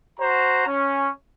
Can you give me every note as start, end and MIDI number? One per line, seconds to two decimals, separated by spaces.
0.19 0.64 66
0.19 0.64 72
0.19 0.64 82
0.66 1.10 61